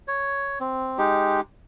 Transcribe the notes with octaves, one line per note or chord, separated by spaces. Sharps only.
C#5
C4
G#3 D#4 G4